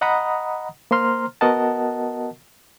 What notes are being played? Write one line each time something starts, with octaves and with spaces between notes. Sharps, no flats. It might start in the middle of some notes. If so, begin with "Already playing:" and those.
D#5 F#5 A#5 B5 D#6
A#3 C5 A#5 C6 F6
B3 F#4 A#4 D#5 F#5 A5